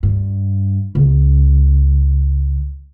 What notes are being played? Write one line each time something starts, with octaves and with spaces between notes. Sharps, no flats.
G2
C#2